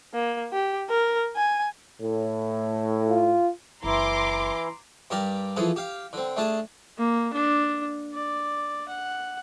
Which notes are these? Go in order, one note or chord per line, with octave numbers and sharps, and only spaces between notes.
A#3
G4
A#4
G#5
A2
F4
F#1 E3 E4 A#5 C6 D6
G2 G4 A#4 D5
E3 F3 G#4 A4
G4 F5
D3 C4
A3 D4 G#4 A5
A#3
D4
D5
F#5